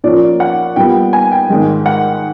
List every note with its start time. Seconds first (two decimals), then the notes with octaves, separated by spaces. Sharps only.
0.04 A#2 F3 A#3 C#4 D5
0.40 F#5
0.76 A#2 G3 B3 G5
1.13 G#5
1.32 G5
1.50 G#2 D#3 G#3
1.86 F#5